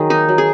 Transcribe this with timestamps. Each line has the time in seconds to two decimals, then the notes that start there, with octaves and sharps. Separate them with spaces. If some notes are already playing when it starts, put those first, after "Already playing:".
Already playing: D#3 F#3 G#4
0.10 A#3 D#4
0.29 F#3
0.38 G#4